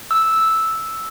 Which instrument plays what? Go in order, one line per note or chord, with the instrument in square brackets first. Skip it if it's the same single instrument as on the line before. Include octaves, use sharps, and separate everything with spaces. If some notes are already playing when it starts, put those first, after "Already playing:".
[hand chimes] E6